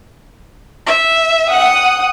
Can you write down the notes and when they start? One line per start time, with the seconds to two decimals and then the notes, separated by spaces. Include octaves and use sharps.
0.87 E5
1.49 F#5 G5 D#6